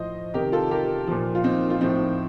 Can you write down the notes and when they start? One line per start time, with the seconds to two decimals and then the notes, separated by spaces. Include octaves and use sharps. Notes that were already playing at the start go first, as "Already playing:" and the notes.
Already playing: A2 F3 C5 D#5
0.34 C3 D#3 G4 A#4
0.52 F4 A4
0.71 G4 A#4
1.07 A#2 F3
1.35 F4
1.44 C4 D#4
1.70 F4
1.81 A2 F3 C4 D#4